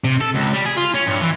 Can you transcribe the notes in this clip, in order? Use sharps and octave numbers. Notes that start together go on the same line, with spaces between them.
C3
A4
C#2
G3
G#4
F4
C#4
G2
E3